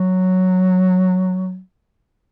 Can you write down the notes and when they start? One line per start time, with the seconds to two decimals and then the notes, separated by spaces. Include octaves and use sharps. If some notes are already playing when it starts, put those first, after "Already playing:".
Already playing: F#3